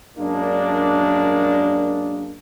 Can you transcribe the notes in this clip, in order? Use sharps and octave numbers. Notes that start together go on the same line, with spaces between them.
F#2 G#3 A#3 D4